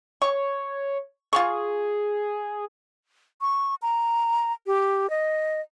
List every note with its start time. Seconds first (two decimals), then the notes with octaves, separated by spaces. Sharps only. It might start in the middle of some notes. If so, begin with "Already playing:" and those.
0.22 C#5 C#6
1.33 F4 G#4 F5 C#6
3.41 C#6
3.82 A#5
4.67 G4
5.10 D#5